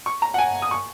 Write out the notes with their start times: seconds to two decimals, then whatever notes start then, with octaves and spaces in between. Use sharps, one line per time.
0.06 C#6
0.22 A#5
0.34 F#5
0.38 G#5
0.62 D#6
0.71 C#6